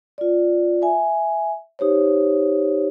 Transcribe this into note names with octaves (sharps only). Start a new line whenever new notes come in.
F4 D5
E5 G#5
D#4 G4 C5 C#5